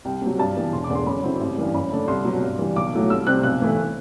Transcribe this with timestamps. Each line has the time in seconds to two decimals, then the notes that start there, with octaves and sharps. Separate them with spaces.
0.05 C2 G5
0.22 C3 F#3
0.39 G2 A5
0.56 E3 G3 B3
0.72 E1 C6
0.84 D6
0.90 E2 D3
0.95 C6
1.06 F#2 B5
1.23 D3 F#3 C4 E4
1.41 A1
1.57 G2 E3 G3
1.74 F#2 B5
1.91 D3 A3 D4
2.08 C2 C6
2.25 B2 F#3
2.42 G2
2.59 E3 G3
2.76 B1 D6
2.93 A2 F#3 A3 E4
3.10 C2 E6
3.26 C3 G3 C4 F#6
3.43 B1 F#6
3.61 A2 E3 A3 E4